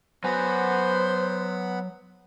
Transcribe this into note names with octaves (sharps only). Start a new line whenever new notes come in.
F#3 B3 C5 F#5 G#5 B5